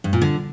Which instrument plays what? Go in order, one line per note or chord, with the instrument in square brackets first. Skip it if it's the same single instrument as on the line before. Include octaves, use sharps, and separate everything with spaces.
[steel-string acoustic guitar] G2
A#2
D3